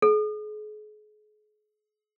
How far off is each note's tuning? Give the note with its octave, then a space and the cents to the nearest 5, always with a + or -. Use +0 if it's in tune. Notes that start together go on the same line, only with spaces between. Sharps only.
G#4 +40